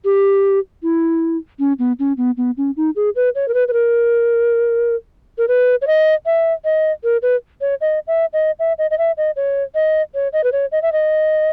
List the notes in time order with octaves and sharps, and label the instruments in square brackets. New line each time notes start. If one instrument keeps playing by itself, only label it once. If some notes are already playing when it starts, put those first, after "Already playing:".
[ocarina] G4
E4
C#4
B3
C#4
B3
B3
C#4
D#4
G#4
B4
C#5
A#4
B4
B4
A#4
A#4
B4
C#5
D#5
E5
D#5
A#4
B4
C#5
D#5
E5
D#5
E5
D#5
D#5
E5
D#5
C#5
D#5
C#5
D#5
B4
C#5
D#5
E5
D#5